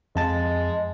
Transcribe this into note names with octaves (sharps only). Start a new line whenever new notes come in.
F2 G#3 A5 A6